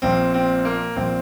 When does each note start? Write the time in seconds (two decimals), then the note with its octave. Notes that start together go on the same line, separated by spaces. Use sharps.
0.02 A#1 A#2 C4
0.34 C4
0.65 A#3
0.96 A#1 A#2 C4